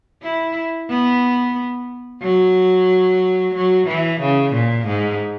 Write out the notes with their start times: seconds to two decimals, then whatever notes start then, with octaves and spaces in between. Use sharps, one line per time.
0.23 E4
0.90 B3
2.22 F#3
3.54 F#3
3.87 E3
4.20 C#3
4.53 A#2
4.87 G#2